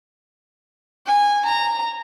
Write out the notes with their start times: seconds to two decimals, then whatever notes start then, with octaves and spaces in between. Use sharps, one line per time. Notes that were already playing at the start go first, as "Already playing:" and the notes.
1.07 G#5
1.45 A#5